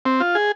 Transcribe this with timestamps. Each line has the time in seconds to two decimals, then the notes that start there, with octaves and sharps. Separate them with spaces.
0.05 C4
0.20 F4
0.35 G#4